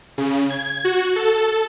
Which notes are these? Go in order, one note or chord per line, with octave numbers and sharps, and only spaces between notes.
C#3
G#6
F#4
A4